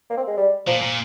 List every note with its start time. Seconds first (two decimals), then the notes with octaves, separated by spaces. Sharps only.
0.10 A#3
0.17 C4
0.27 G#3
0.37 G3
0.67 A#2 F3
0.82 A#2